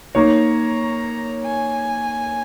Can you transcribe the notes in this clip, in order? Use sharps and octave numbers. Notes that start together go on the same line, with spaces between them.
A#3 D#4 C#5 A#5
G#5